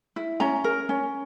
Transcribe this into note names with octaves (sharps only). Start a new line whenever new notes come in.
E4
C#4 A#5
A#4
C#4